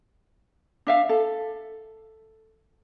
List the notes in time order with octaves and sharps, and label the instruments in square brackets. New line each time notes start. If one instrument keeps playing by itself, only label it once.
[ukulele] D4 E5 F5
A4